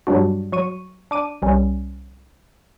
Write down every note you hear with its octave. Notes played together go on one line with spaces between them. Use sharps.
G2 F#3 G3 D4 F#4
F#3 C#6 D#7
D4 D6 D#7
C2 G3 C#4